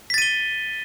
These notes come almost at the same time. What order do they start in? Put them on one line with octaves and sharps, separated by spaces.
B6 A6 D#7 G7